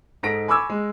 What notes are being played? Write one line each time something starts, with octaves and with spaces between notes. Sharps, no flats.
G#2 D#4 A4 A#6 B6 D7
G#5 B5 C#6 D6 E6 G#6
G#3